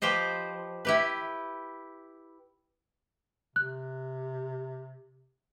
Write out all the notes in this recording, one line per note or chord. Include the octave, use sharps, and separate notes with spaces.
F3 G4 B4 C5 D#5
E4 G4 B4
C3 F#6